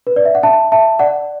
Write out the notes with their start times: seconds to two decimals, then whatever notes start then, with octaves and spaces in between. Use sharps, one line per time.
0.07 B4
0.16 D5
0.25 E5
0.35 F#5
0.43 E5 A5
0.72 E5 A5
0.99 D5 F#5